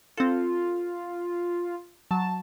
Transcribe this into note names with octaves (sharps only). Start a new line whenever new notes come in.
C4 F4 A4
F#3 A5